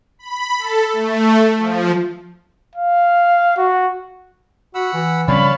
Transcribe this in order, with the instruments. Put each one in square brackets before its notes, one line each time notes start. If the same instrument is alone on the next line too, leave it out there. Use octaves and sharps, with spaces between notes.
[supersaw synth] B5
A4
A3
F3
[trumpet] F5
F#4
[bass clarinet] F#4 [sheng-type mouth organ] F#5 B5 E6
[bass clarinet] E3
[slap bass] C#3 F3 C4 [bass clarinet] G3 [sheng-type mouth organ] C#5 F5 A5 [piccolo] B5